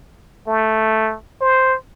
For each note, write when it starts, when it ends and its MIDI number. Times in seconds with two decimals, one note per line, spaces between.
0.47 1.16 57
1.41 1.75 72